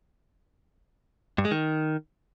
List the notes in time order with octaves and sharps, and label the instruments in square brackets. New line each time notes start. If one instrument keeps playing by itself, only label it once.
[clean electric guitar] G2
G#3
D#3